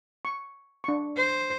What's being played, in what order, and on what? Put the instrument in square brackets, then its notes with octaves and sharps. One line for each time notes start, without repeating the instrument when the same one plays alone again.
[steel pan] C#6
D4 C#6
[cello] C5